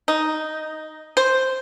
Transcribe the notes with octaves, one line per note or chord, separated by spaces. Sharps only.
D#4
C5